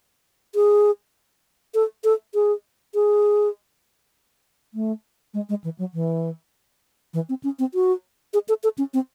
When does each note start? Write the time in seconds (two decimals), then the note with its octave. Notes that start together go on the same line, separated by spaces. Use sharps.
0.55 G#4
1.74 A4
2.04 A4
2.34 G#4
2.94 G#4
4.74 A3
5.34 G#3
5.49 G#3
5.64 E3
5.79 F#3
5.94 E3
7.14 E3
7.29 C4
7.44 C#4
7.59 C4
7.74 F#4
8.34 G#4
8.49 A4
8.63 A4
8.78 C#4
8.94 C4